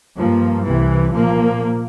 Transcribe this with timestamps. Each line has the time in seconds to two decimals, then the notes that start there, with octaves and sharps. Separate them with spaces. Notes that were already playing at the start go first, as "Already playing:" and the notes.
0.17 G2 F3 A#3
0.66 C2 C3 E3
1.14 A#2 F3 A#3